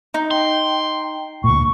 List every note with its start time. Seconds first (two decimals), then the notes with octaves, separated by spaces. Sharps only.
0.14 D#4
0.31 G5 C6
1.44 D2 A#2 C#6